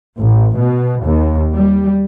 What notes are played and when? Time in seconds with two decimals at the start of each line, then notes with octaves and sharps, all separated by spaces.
0.19 A1
0.59 B2
1.04 D#2
1.53 G3